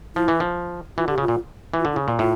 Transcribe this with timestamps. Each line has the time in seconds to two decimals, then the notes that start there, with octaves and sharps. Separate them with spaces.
0.15 F3 E4
0.28 E3
0.40 F3
0.97 E3 F4
1.08 D3 G4
1.18 C#3
1.21 F4
1.28 A#2
1.74 E3
1.79 F4
1.85 D3
1.93 E4
1.96 C#3
2.06 A#2 F4
2.19 A2 F4